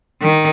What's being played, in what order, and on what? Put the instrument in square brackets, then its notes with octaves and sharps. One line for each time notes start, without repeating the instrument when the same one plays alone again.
[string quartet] D#3